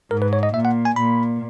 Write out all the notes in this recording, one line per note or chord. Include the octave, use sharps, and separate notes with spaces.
G#2 A#4
B4
C#5
D#5
A#2 E5
F#5
G#5
A#2 B5